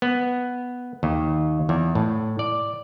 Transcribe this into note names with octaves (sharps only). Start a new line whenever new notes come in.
B3
D#2
E2
A2
D5